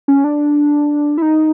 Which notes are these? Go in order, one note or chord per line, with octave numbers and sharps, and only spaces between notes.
C#4
D4
E4
D#4